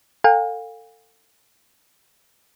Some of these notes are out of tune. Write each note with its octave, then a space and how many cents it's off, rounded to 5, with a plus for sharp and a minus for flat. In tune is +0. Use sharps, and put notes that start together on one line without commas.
A4 +30 F5 +35 G#5 -45